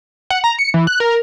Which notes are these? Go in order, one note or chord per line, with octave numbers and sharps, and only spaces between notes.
F#5
A#5
C#7
E3
F#6
A#4